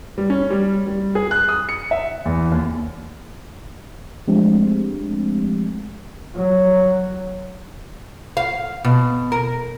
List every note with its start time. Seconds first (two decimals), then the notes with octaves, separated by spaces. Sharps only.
0.18 G3
0.30 C#4
0.50 G3
0.87 G3
1.15 G#4
1.31 F#6
1.49 D#6
1.69 C#7
1.91 E5
2.25 E2
2.52 D#2
4.28 F3 G#3 A3 C4 D4 G4
6.36 F#3
8.37 F5
8.84 B2
9.32 A#4